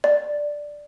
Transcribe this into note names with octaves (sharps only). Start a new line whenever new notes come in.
D5